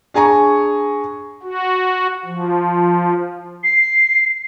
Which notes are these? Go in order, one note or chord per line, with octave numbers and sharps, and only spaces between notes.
D4 G#4 G#5 A#5 C#6
F#4
F3
C7